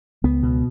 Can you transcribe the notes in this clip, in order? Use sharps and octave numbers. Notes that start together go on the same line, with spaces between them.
C#2 B3
B2